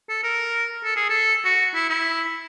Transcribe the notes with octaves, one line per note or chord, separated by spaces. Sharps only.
A4
A#4
A4
G#4
A4
F#4
E4
E4